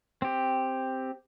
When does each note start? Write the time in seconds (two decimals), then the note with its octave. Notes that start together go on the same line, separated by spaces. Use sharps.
0.22 C4 G4